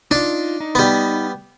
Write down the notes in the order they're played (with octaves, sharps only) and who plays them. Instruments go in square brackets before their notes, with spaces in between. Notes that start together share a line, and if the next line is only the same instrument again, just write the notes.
[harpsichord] D4 [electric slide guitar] D#4 F4
[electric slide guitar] D#4
[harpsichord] G3 B3